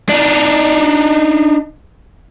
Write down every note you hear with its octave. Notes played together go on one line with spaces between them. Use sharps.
D4 D#4